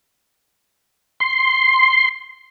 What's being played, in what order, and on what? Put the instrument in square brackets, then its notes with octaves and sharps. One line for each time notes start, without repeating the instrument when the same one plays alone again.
[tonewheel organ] C6